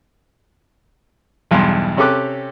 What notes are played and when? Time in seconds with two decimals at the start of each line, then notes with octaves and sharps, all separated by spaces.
1.51 B1 E2 G2 C6
1.97 C3 C#4 G4 A4 D6 F#6